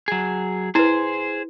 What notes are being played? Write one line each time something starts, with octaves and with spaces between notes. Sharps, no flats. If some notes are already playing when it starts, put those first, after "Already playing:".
F#3 G#4
E4 G#4 B4 C5